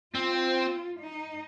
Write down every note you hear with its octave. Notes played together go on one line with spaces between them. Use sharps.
C4 F4
D#4